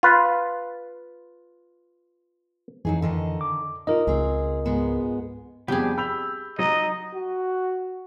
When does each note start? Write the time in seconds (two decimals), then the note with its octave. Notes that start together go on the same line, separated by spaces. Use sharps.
0.03 F4 B4
2.85 F2 E3 F#3 D#4 G#4
3.02 D3 D#3 D#5
3.41 D6
3.87 D#4 F4 A#4 D#5
4.07 C#2 C4 G#4
4.66 G#2 G#3 B3
5.68 F2 G3 B3 D4 G4 G#4
5.98 B5 E6 G6 F7
6.59 F#3 D#4 D#5
7.14 F#4